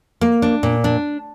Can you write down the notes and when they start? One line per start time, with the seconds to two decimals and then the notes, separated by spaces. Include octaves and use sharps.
0.21 A#3
0.42 D4
0.63 A#2
0.84 D4